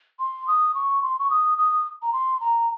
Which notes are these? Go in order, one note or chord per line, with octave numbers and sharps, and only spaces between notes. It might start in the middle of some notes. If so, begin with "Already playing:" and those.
C6
D#6
C#6
C6
C#6
D#6
D#6
A#5
C6
A#5